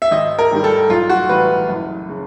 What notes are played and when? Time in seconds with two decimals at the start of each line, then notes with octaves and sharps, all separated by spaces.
0.02 E5
0.11 G#1 D#5
0.39 A#4
0.51 G#2 D#3 G3
0.64 A4
0.90 B1 F4
1.09 F#4
1.29 A2 E3 G3 B4
1.69 F#1
2.09 C#3